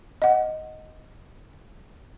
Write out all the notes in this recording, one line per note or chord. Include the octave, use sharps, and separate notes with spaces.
D#5 F#5